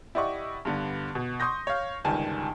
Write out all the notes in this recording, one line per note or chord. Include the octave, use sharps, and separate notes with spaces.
E4 G4 D5 D#5 F#5 C#6
G2 D3 B3
B2
C6 C#6 D#6 G6 A#6
C#5 F5
G1 C#2 D#3 G3 G#5 A5